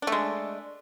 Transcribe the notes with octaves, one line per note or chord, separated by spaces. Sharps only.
G#3 A3 D4